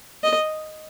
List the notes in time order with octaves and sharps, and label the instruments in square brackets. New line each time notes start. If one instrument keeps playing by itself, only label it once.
[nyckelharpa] D#5